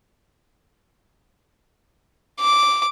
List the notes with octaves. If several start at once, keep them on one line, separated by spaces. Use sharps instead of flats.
D6